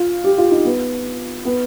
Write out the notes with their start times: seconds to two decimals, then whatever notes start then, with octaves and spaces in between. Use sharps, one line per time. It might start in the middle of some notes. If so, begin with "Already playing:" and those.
Already playing: F4
0.24 G4
0.38 F4
0.51 D#4
0.65 B3
1.45 B3